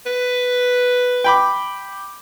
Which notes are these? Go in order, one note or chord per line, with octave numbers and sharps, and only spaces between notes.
B4
G5 B5 D6